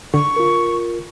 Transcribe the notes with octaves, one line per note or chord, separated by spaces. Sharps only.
D3 C#6
F4 A#4